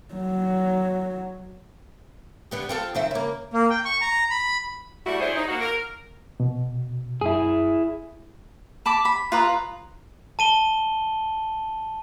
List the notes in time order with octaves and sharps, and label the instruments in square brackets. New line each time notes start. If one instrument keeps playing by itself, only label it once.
[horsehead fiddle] F#3
[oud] D3 B3 G4
C4 F4 A4
D#3 C4 E5
C#3 A#3
[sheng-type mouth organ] A#3
G5
C#6
A#5
B5
[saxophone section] G3 A3 E4 F#4
D4 E4 G#4 C5 C#5
D#4
A#3 F#4
A#4
[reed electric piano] B2
[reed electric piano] F#2 [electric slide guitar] E4 G#4
[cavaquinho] A5 B5 D6
B5
F4 B4 A#5 D#6
[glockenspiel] A5 D#7 G7